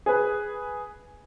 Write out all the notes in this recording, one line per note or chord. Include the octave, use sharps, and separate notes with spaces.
G#4 B4